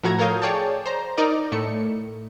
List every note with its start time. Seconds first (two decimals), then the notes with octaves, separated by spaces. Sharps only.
0.03 A2 F3 F#4 A4 A#5 G#6
0.19 A4 A#4 C#5 F5 D#6 G6
0.42 G#4 C#5 D5 G5 A5
0.86 C5 A#5
1.17 D#4 A#4 D5 D#5
1.52 A2 A3 C#7